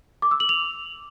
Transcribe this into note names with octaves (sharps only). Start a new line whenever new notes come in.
D6
E6
F#7
F7